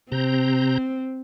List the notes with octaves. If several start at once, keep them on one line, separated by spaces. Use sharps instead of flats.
C3 C4 A#5 G6